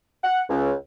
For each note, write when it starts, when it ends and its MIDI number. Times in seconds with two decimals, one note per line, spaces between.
0.24 0.43 78
0.49 0.73 37